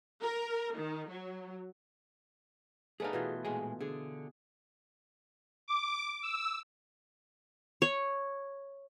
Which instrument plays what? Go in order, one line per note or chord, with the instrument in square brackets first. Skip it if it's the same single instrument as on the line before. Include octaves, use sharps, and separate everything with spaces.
[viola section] A#4
D#3
F#3
[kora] A3 B3 D#4 [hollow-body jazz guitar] G#4 D5 F5
[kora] B2 E3 F4
[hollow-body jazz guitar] A#2 G#3 G#4
[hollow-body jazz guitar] D3 [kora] G#4
[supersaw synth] D6
E6
[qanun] C#5